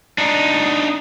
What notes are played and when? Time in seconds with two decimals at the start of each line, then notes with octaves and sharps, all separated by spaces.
0.18 D4 D#4